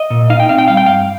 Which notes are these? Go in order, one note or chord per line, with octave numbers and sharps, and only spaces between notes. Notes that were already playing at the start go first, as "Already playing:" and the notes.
Already playing: D#5
A#2
D#4 F5
G5
C4 F5
G5
G3 F5
G5
G2 F5